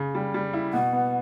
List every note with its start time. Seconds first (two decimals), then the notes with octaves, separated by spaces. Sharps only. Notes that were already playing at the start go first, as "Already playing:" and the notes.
Already playing: C#3
0.15 G3
0.34 G3
0.53 E4
0.73 B2 F#5
0.93 B3